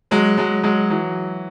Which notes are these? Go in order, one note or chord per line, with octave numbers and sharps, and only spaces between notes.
F#3 G#3
F#3 G#3
F#3 G#3
E3 F#3